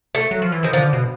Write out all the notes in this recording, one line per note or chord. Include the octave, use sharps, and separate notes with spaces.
A3
F#3
F3
E3
D#3 F3
D3 F3
B2